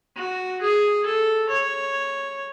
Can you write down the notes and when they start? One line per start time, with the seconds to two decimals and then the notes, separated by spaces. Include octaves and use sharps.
0.16 F#4
0.62 G#4
1.06 A4
1.50 C#5